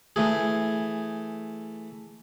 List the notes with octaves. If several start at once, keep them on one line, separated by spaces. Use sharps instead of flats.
E3 A3 G#4